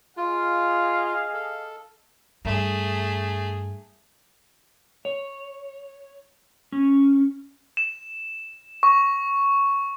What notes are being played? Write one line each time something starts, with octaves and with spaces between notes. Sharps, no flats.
F4 G#4 D#5 F5
A4
G2 A3 G#4
C#5
C#4
E7
C#6